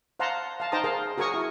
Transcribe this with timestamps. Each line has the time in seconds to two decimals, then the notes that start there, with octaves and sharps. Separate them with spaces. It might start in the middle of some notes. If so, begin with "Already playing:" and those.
0.20 C5 F5 F#5 A5 A#5 C6
0.60 F5 A5
0.72 D#4 C5 G5 A5 A#5 D#6
0.84 G#4 A#4 C5 F5
1.18 F#4 G#4 A#4 G#5 C#6 D#6
1.34 E4